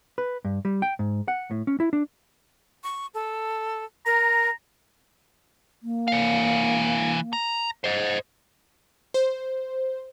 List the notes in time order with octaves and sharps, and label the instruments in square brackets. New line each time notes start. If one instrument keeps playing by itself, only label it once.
[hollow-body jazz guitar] B4
G2
G3
G5
G#2
F#5
A2
C#4
E4
D4
[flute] C#6
A4
[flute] A#4 [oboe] A#5
[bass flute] A#3
[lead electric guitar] E3 F5
A#5
C5 D#5
[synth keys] C5